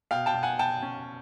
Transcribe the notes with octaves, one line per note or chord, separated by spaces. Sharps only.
B2 F5 G5
G5 A5
B2
F#5 G#5
B2 G5 A5
C#4